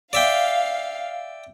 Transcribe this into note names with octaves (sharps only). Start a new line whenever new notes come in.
D5 E5 F5 G5